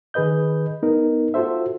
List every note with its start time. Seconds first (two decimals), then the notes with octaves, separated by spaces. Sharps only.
0.14 D#3 G#4 B4 D#5 G6
0.83 B3 D#4 A#4
1.34 F4 F#4 A4 C5 E5